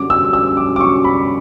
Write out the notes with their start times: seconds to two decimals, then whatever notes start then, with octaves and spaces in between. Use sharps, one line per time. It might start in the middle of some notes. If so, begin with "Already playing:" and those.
Already playing: F#2 D3 G3 C#4 F#4 D6
0.10 E6
0.33 E6
0.57 D6
0.76 D6
0.81 C#6
1.04 B5